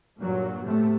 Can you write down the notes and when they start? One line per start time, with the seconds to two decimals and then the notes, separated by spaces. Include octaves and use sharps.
0.19 G2 A#2 F#3
0.65 A2 C3 A3